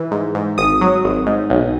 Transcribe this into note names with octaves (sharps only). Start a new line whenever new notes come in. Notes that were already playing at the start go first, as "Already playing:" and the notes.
Already playing: E3
G#2
G#2
G#1 D#6
F#3
G#1
G#2
B1